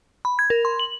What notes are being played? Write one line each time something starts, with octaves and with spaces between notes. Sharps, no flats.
B5
G#6
A#4
C6
F#7